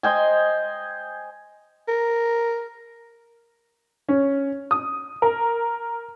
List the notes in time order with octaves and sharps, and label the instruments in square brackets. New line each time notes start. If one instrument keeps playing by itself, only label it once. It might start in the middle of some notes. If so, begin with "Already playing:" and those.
[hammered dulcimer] C5 D#5 G5 G#5
[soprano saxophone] A#4
[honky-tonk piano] C#4
D#6
A#4